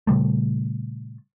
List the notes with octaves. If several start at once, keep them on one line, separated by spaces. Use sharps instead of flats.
A#2 C#3 G3 A3